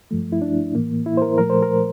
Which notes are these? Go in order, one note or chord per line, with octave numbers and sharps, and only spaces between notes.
G2 F3 A3
E4
D4
A2 E3 A#3
E4
C5
A#4
A#2 F3 A3 A#4
C5
A#4